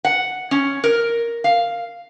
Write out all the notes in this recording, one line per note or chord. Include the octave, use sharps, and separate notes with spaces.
F#5
C#4
A#4
F5